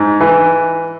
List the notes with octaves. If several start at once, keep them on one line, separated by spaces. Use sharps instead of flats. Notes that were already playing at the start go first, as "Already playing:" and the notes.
Already playing: G#2
E3